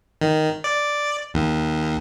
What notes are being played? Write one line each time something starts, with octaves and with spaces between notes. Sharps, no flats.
D#3
D5
D#2